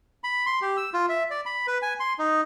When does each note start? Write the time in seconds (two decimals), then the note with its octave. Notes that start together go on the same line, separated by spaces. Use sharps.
0.24 B5
0.46 C6
0.62 G4
0.77 E6
0.94 F4
1.09 E5
1.30 D5
1.46 B5
1.67 B4
1.82 G#5
2.00 C6
2.19 D#4